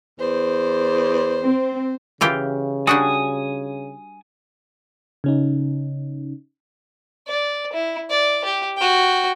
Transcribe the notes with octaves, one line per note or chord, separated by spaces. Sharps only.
E2 C5
C4
C#3 E3 F4 G4
G3 D4 F#4 G#5 D#6
C#3 C#4 D#4
D5
E4
D5
G4
F#4 G5